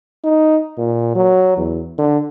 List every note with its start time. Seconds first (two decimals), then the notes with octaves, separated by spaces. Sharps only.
0.25 D#4
0.78 A#2
1.16 F#3
1.57 E2
1.98 D3